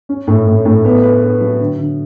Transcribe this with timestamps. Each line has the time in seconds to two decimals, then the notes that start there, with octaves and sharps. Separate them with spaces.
0.09 C#4
0.27 A2
0.46 A2
0.65 A2
0.85 B3
1.03 B4
1.22 B4
1.41 F#3
1.60 D3
1.79 D3